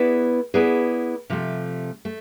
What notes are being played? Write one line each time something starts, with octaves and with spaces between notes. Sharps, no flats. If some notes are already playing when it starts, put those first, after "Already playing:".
Already playing: B3 E4 G#4 B4 D5
B3 E4 G#4 B4 D5
C3 F3 A3
A3